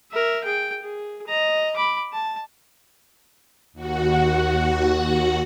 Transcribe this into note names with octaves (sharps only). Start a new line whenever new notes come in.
A#4 E5
G#4 G5
G#4
D#5 A#5
B5 D6
A5
D#2 F#4 F#5